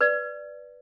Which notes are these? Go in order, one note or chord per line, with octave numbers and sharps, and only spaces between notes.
B4 D5